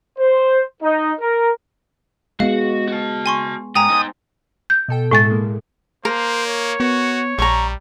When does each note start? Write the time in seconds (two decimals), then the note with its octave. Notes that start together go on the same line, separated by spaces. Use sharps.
0.19 C5
0.82 D#4
1.20 A#4
2.40 G#3 B3 F#4 F5
2.88 F#4 A5
3.26 G#5 C6 C#6
3.75 G#2 G5 G#5 A#5 D#6
3.89 D#4 C5
4.70 G6
4.88 B2 A4 G5
5.11 A2 G#3 E4 A4 G#5 A6
5.30 G#3 A#3
6.05 A#3 A#4 C5
6.46 C#5
6.80 B3 F#4
7.39 A#1 G3 A#5 C#6